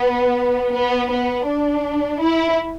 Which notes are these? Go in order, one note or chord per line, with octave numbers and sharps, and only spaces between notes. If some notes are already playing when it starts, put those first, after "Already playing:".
Already playing: B3
B3
B3
D4
E4